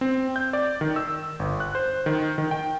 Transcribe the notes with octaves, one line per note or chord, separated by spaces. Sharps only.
C4
G6
D5
D#3
E6
G1
F#6
C5
D#3
D#3
G5